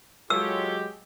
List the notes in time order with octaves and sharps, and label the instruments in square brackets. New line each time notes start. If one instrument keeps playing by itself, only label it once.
[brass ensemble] F#3 G#3 G4 [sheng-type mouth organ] F4 A4 C#5 [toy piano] E6